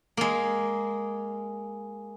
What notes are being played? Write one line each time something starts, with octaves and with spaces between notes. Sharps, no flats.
G#3 A#3